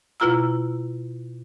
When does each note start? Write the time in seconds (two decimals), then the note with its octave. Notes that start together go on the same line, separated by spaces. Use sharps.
0.20 B2 E4 F4 A#5 E6